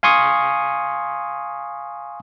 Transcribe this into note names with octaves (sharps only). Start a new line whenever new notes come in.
F5 G#5 C6 C#6 D#6